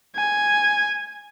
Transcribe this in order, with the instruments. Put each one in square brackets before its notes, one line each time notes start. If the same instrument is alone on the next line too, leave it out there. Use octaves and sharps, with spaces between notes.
[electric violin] G#5